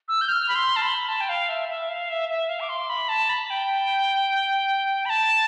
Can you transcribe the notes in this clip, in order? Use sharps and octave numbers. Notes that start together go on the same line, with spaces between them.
E6
G6
F6
B5
C6
A5
B5
A5
G5
F5
E5
E5
F5
E5
E5
F5
D6
C6
B5
A5
B5
G5
B5
A5